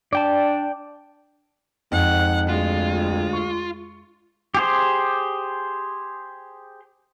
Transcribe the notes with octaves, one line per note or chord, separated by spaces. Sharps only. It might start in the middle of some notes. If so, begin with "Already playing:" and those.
D4 D5 G5 A5
F2 G#2 F#5
D2 G#3 F4
C#6
G4 G#4 C5